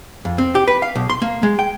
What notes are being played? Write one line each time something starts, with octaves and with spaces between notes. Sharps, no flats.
F2
C4
G4
B4
F5
B1
C6
A#3
G#3
G5